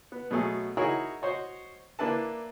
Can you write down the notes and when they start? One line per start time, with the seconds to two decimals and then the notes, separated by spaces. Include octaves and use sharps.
0.12 B3
0.31 B2 F#3 A3 G#4
0.77 D#4 E4 F#4 G#4 A#4 C#5
1.22 F#4 C5 C#5 D#5
1.99 A#3 D4 E4 B4 A5